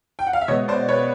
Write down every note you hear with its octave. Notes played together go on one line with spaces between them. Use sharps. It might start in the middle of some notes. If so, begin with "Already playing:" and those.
G5
F#5
F5
E5
B2 G#3 B3 C#5 D#5
C5 D5
B4 C#5